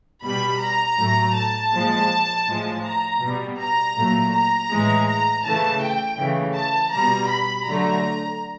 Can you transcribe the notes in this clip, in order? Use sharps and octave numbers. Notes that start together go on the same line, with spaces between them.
B2 G3 B5
A#5
A2 F#3 A3
A5
A#2 F3 G#3
A2 F3 G#3
A#5
B2 G3
A#5
A#2 F#3 A3
A#5
A2 E3 G#3
A#5
C#3 E3 A3 A5
G5
C#3 E3 A3
A5
B2 G3 A#5
B5
D3 F#3 A3 A#5